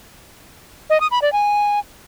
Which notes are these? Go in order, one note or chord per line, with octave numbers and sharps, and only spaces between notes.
D#5
D#6
B5
D5
G#5